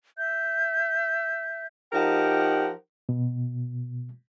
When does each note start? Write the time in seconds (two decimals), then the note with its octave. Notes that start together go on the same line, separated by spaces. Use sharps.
0.16 E5 G6
1.93 F3 D#4 G4 A#4 F#5 G5
3.09 B2